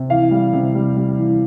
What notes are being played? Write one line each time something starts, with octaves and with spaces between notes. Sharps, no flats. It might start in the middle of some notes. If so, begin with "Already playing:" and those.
Already playing: C3
E3 F5
G3
C3
G3
G3
E3